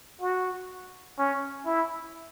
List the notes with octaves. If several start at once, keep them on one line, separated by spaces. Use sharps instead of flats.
F#4
C#4
E4